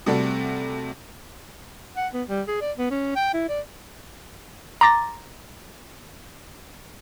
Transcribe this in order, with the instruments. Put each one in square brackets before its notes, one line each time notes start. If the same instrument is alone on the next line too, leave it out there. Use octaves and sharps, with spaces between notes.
[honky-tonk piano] C3 G3 A3 F#4 A4
[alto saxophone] F#5
B3
G3
G#4
D5
B3
C#4
G5
E4
D5
[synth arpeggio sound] A#5 C6 D6 A6 A#6